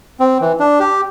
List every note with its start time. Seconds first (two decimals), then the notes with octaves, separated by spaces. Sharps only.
0.20 C4
0.41 E3
0.60 D4
0.80 G4